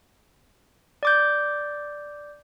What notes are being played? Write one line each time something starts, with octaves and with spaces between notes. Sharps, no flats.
D5 D6 G6